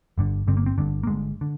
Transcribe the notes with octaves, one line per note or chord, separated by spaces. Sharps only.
G1 G2 D3
G1 G2 D3 C4
A#3
C4
G1 G2 D3
A#3
G1 G2 D3 G#3
D3